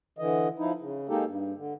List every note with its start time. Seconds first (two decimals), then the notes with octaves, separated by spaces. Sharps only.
0.19 D3 E3 D#5
0.59 F3 D#4 E4
0.81 C#3
1.09 G#3 A#3 D#4 G4 A4
1.26 G2
1.57 D3